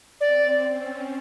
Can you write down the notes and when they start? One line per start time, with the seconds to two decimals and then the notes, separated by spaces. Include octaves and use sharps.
0.21 C4 D5
0.66 C#4